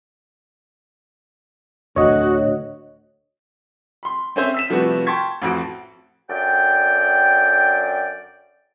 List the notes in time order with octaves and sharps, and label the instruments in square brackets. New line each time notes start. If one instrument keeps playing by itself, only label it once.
[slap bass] D1 G1 [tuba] D2 [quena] F#4 [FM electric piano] C#5 D#5
[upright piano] B5 C6
C4 C#4 C5 E5
E6 B6 E7
C3 F3 G3 A3 B3 F#4
G5 A5 C6 C#6 G#6 B6
A1 F2 F#4 D7
[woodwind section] F#2 D3 D5 G5